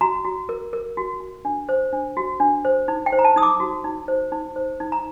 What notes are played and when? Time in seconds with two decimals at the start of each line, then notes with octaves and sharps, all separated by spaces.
0.01 F#4 A#5
0.25 F#4
0.49 A#4
0.73 A#4
0.97 F#4
1.20 F#4
1.45 D4
1.69 C5
1.93 D4
2.17 F#4
2.40 D4
2.65 C5
2.88 D#4
3.06 G5
3.12 C5
3.19 A#5
3.25 A5
3.36 D#4 D#6
3.43 D6
3.60 F#4
3.84 D#4
4.08 C5
4.32 D#4
4.56 C5
4.80 D#4
4.92 A#5